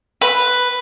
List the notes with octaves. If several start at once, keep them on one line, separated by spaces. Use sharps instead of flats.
B4